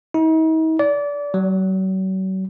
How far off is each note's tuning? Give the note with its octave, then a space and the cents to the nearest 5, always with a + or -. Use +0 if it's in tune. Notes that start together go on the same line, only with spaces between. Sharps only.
D#4 +45
D5 -25
F#3 +40